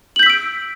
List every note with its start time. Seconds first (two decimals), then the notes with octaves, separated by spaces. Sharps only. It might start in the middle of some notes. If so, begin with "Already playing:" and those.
0.16 F#7
0.19 G6
0.23 B6
0.26 E6
0.30 D7